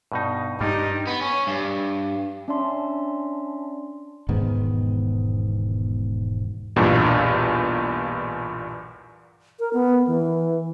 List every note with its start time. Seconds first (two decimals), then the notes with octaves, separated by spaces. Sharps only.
0.12 G2 B2 D#4
0.61 G2 G3 D#4
1.07 B3
1.21 C#4
1.47 G2
2.48 C#4 D4 D5 E5 A5 C6
4.29 E1 G#2 D#3 B3
6.76 B1 E2 G2 A#2
9.60 A#4
9.73 B3
10.07 E3